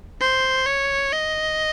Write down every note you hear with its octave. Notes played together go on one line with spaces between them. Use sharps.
C5
C#5
D#5